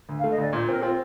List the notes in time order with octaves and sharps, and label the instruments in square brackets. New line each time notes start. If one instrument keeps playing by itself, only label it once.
[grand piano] D2
[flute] F5
[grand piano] A3
[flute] D#5
[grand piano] D2 [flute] D5
[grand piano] A#2 [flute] C5
[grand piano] C4 [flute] A#4
[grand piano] C4 [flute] F4